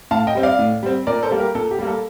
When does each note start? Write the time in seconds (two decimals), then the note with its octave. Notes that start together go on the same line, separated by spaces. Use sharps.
0.11 A2 F5 A5
0.27 D#5 G5
0.35 G3 C4
0.43 D5 F5
0.59 A2
0.83 G3 C4
1.07 A#2 A#4 D5
1.23 A4 C5
1.31 G3 A#3
1.39 G4 A#4
1.55 A#2 A4
1.71 G4
1.79 G3 A#3
1.87 A4